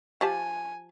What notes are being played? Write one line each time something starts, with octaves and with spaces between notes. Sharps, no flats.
F3 G4 G#5 A5